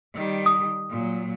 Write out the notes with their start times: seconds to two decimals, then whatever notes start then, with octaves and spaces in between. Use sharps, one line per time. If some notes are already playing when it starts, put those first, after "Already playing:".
0.14 D#3 G3
0.46 D#6
0.90 A#2 F#3